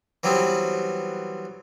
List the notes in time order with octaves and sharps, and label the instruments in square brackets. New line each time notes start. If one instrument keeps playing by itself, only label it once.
[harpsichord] E3 F#3 G3 B3 C4